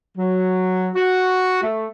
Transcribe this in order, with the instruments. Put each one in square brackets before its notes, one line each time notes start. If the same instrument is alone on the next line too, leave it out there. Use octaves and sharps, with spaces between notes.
[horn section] F#3
F#4
A3